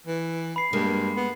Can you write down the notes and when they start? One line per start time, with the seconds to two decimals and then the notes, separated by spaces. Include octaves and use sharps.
0.07 E3
0.56 B5 C7
0.73 G2 G#3 A#3
1.16 B3